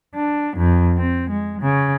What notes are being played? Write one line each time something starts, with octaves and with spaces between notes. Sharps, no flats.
D4
F2
C4
G#3
C#3